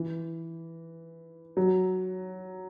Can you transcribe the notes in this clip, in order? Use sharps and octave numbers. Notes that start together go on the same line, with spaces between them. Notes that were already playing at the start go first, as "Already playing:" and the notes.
Already playing: E3
F#3